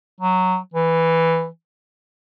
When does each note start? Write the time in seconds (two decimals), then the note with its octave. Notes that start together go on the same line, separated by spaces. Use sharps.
0.21 F#3
0.74 E3